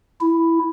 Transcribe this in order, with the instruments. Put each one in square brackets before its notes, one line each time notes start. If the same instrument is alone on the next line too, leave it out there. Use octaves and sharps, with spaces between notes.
[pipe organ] E4